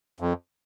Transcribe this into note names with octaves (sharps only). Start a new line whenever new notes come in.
F2